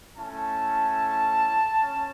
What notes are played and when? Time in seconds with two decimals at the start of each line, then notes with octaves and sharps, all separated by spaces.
0.16 A3 C#4 E4 A5
1.82 C#4